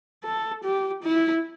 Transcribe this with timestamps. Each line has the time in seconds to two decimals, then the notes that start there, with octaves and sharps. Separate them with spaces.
0.24 A4
0.63 G4
1.03 E4